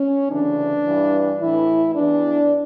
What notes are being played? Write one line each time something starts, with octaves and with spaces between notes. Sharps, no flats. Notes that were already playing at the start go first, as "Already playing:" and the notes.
Already playing: C#4
D2 C#3 E3 D4
G2 E3
A2 E3 E4
E2 E3 D4